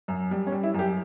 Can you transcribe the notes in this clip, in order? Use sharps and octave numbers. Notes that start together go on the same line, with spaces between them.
F#2
G3
C#4
G3
E4
F#2 G4